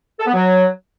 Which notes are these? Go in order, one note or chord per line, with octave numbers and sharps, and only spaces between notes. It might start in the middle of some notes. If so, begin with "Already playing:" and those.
A4
B3
F#3